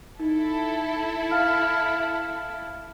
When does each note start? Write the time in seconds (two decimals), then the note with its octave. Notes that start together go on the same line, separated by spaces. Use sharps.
0.19 D#4 E4 A4
1.31 F5 F6